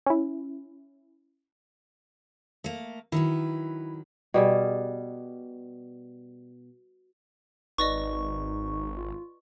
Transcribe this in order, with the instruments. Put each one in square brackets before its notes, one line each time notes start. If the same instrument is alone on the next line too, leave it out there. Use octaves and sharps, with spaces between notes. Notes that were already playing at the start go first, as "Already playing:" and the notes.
[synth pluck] C#4 E4
[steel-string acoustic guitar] A3 A#3
[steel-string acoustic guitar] D#3 F#3 B4 [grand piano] E4
[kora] B2 G3 G#4
[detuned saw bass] G#1 [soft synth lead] D#4 [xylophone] B4 D5 D#5 [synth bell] C#6
[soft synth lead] F4